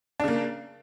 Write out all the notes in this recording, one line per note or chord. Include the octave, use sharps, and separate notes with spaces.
C#3 A#3 D4